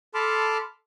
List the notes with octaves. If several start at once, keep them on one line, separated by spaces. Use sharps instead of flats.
A4 A5 B5 C6 D6 F6